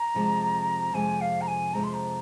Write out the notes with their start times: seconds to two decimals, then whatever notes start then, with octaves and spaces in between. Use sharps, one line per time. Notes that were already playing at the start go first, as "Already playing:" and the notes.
Already playing: A#5
0.14 F2 C3 F3 G#3 C4
0.94 F2 C3 F3 G#3 C4 G#5
1.21 F5
1.41 A#5
1.48 G#5
1.74 F2 C3 F3 G#3 C4 A#5
1.84 C6
1.94 A#5